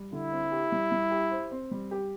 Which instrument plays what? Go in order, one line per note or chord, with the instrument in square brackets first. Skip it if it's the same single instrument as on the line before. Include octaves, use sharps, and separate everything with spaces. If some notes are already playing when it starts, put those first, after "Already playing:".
Already playing: [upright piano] G3
[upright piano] D3 [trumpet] E4
[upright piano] C4
G4
G3
G3
G4
C5
C4
G3
G4